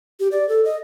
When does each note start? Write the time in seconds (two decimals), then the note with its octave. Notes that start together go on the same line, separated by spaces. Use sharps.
0.20 G4
0.32 D5
0.49 A4
0.65 D#5